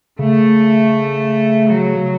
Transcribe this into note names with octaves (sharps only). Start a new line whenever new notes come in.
C#3 A3
F#3